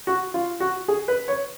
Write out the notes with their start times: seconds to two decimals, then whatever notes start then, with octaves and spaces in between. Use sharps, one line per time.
0.07 F#4
0.34 F4
0.60 F#4
0.88 G#4
1.08 B4
1.28 C#5